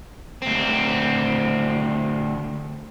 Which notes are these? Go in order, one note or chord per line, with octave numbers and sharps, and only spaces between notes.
D2 C4